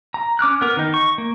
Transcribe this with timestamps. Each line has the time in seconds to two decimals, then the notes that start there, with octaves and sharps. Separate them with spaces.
0.14 A#5
0.39 C#4 D6 F6 F#6
0.61 B3 A#4 F6
0.77 D#3 D#4
0.94 C#6
1.18 A#3